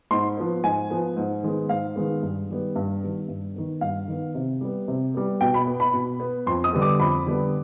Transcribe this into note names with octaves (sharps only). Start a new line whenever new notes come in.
G#2 C6
F3 B3
G#2 G#5
F3 B3
G#2
D#3 G#3 B3
G#2 F5
D#3 G#3 B3
G2
D#3 G3 B3
G2
D#3 G3 B3
G2
D#3 B3
G2 F5
D#3 B3
C3
G3 B3
C3
G3 B3
B2 G5
B5
B3
B5
B2
B3
F2 C6
D#6
D3 G3 B3
D6
F2 B5
D3 G3 B3